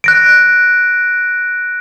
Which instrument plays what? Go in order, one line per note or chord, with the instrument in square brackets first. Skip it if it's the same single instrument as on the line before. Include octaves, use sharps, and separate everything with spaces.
[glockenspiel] F#6 A#6 D7